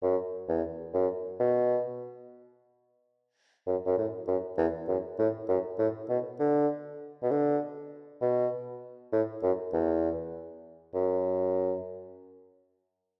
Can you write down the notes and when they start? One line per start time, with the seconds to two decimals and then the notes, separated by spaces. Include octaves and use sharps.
0.03 F#2
0.49 E2
0.94 F#2
1.40 B2
3.67 F#2
3.86 F#2
3.97 A2
4.28 F#2
4.58 E2
4.88 F#2
5.19 A2
5.49 F#2
5.79 A2
6.09 B2
6.40 D3
7.23 B2
7.31 D3
8.21 B2
9.13 A2
9.43 F#2
9.73 E2
10.94 F#2